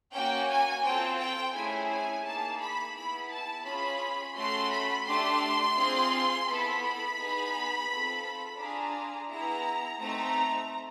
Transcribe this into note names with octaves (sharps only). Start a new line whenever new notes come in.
A#3 C#4 F#4 G5
G#5
C4 F4 A4 G5
G5
A3 C#4 E4 G#4 G#5
G#5
A#3 D#4 G#4 A5
B5
B3 E4 G#4 B5
A5
C#4 F4 G#4 B5
A3 C#4 F#4 C6
B5
A3 D4 G4 C6
C4 F4 G#4
B3 E4 A4 B5
B3 D#4 G#4
C4 F4 A4
D4 F4 G#4 A#5
B3 E4 G#4 A#5
A3 C4 D#4 A#5